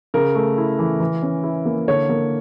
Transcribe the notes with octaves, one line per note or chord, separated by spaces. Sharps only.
C#3 A#4
A3
E4
E3
E3
C#4
E4
A#3
D3 C#5
A#3